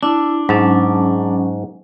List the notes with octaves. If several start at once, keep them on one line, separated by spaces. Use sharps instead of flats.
D4 E4
G#2 F#3 C#4 A5